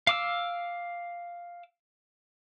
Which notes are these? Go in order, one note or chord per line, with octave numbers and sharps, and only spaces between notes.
F5 D6 E6